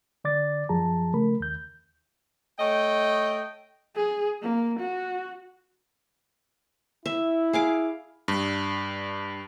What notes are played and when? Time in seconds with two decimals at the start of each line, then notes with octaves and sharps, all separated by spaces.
0.24 D3 D5 D6 A6
0.69 F#2 F3 G#4 A5 A#5
1.13 C#3 A3 A#4 B5
1.40 D#2 G6
2.59 A3 C#5 D#5 G5
3.96 G#4
4.42 A#3
4.80 F#4
7.06 E4 E5
7.53 G#4 F5 D6
8.28 G2